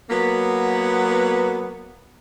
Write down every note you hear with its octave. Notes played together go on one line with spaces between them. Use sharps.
F#3 A#3 B3